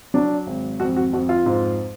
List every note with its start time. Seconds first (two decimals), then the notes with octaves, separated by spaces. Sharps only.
0.14 F#3 D4
0.47 G#1
0.80 F2 F#4
0.96 F#4
1.13 F2 F#4
1.29 F4
1.46 G#2